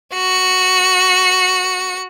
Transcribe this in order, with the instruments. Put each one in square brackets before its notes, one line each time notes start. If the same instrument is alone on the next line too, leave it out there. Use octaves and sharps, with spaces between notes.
[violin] F#4 C#7